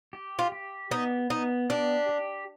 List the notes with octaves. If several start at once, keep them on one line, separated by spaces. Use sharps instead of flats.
G4
F4
G4
B3 D#4
B3 D#4
D4 G4
G4